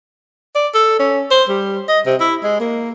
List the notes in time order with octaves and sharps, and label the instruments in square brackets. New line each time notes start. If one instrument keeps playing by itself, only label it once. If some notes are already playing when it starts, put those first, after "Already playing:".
[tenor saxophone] D5
A4
C#4
C5
G3
D#5
C3
E4
G#3
A#3